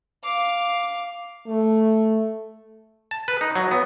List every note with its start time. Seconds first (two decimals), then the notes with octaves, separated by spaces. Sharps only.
0.24 F5 D6
1.46 A3
3.11 A5
3.28 B4
3.41 D#4
3.56 F#3
3.71 B3